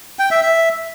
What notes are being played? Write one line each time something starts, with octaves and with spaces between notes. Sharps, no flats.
G5
E5
E5